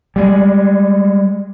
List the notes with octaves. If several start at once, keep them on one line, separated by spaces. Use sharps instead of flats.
G3 G#3